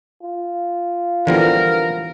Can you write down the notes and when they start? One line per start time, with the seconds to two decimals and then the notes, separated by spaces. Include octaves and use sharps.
0.22 F4
1.27 D3 E3 F3 G3 B3 A#4